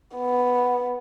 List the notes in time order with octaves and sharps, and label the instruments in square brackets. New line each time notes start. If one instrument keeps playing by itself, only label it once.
[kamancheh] B3